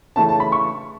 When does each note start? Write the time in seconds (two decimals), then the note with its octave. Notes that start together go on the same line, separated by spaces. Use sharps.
0.16 C#3 E3 A3 C#4 A5
0.29 A5
0.40 B5
0.52 C#6